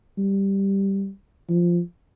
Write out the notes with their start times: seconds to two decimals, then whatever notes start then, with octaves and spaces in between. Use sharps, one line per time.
0.18 G3
1.49 F3